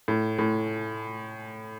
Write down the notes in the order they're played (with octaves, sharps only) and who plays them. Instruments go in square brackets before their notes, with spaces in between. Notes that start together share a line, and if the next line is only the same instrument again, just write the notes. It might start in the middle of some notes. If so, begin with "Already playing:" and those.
[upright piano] A2
A2